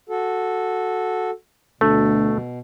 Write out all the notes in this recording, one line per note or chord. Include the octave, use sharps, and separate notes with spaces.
F#4 A4
D2 B2 A3